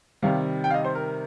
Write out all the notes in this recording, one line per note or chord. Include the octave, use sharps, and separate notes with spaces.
C3 D#3 G3 F5
G5
F5
D#5
C5
A#4